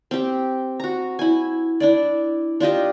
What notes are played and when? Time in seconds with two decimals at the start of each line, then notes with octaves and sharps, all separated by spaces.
0.11 C4 G4
0.80 F#4 A#5
1.19 E4 G#5
1.80 D4 E4 D5
2.60 D4 F4 G4 D#5